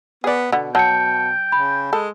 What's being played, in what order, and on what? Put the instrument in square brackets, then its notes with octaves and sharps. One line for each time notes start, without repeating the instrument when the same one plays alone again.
[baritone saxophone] B3 [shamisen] G#4 D5
[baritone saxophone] B2 [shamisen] D3 B3
[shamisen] F#3 [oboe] G5 [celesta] A5 C#7
[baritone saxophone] C#3 [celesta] B5
[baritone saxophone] G#3 [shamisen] A4